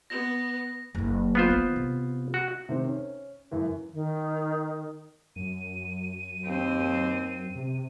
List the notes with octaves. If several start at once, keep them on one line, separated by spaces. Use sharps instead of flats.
B3 A#6
F#1 D3
B3 F4 C5
D#3
C3
F#4
C3 D#3 C5
C#4
F#2 C#3 E3
D#3
F#2 D#7
D#2 C4
C3